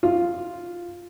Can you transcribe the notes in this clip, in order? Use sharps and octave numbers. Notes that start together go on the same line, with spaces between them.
F4